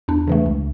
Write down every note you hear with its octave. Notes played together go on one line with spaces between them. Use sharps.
E2 D4
C#3 E3 A3
C#2